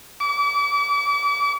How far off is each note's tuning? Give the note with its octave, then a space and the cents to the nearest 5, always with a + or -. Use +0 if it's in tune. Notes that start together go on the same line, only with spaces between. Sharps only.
D6 -40